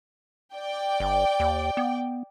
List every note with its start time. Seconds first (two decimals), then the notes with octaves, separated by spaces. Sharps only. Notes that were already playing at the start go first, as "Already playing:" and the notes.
0.55 D5 G5
1.00 G1
1.40 D#2
1.77 B3